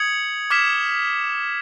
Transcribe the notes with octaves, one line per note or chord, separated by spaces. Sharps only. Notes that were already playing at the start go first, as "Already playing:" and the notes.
Already playing: D#6 G#6 C#7 F#7
D6 F6 G#6 B6 E7